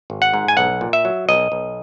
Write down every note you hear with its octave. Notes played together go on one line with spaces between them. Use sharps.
G#1
F#5
G#2
G#5
B1 F#5
A#2
E5
F#3
B1 D#5
B1